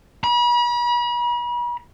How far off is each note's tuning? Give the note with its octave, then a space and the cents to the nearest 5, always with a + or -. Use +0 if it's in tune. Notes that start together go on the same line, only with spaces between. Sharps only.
B5 -40